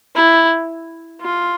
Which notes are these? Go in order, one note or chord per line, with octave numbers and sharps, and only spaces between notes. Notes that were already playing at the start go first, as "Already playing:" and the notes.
E4
F4